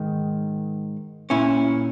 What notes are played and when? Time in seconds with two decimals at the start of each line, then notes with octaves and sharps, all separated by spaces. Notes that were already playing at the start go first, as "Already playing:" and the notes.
Already playing: G#2 D#3
1.30 A#2 C#4 E4